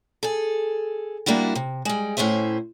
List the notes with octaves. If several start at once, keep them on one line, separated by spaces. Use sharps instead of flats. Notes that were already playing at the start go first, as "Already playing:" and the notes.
G#4 A4
G3 A#3 D4 E4 F#4
C3
G3 G#3
A2 C#4 E4 C5 E5